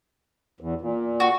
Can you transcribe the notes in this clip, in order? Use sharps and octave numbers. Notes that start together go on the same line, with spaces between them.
E2
A#2
F#4